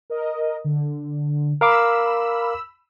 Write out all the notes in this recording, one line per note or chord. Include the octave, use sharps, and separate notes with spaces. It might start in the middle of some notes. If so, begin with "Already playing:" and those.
A#4 D#5
D3
A#4 F5 B5 D6 E6